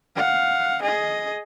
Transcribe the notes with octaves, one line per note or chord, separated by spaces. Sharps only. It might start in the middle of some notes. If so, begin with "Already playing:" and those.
F5 F#5
G#4 D#5